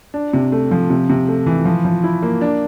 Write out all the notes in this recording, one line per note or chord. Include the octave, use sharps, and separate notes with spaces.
D4
C3
A3
F3
C3
C3
A3
E3
F3
F3
E4
A#3
D4